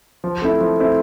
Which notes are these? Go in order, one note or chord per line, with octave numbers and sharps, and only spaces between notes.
F3
A3 C4 E4
F3
A3 C4 E4